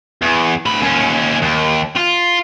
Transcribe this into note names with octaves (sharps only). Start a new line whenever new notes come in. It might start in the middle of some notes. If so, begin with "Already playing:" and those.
E2
D2 B5
D#2 C#4
D#2
F4